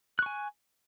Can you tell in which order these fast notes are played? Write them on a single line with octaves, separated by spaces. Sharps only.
F#6 C#6 G#5